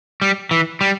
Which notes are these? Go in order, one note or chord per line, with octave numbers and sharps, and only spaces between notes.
G3
E3
G3